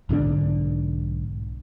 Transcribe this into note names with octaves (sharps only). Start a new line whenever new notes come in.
B1 G#2 D3 D4